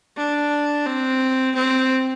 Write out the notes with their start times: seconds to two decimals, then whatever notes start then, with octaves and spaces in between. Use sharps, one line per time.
0.17 D4
0.87 C4
1.56 C4